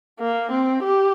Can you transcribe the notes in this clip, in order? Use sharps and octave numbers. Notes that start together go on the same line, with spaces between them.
A#3
C4
G4